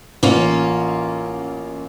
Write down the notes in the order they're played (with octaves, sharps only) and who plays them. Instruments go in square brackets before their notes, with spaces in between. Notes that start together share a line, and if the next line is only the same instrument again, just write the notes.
[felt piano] A1 [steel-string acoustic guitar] A#3 C#4 F4